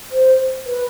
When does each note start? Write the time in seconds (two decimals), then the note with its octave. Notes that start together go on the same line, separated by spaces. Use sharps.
0.11 C5
0.66 B4